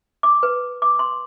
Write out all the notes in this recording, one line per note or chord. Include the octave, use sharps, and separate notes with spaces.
D6
B4
D6
C6